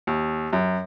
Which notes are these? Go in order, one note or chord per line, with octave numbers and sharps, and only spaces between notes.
D#2
F#2